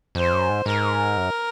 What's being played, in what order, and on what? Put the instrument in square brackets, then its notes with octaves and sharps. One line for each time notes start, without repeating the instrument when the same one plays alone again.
[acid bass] F2 [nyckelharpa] C5
[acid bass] F#2
G#2
[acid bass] G#2 [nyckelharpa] A#4
[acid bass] F#2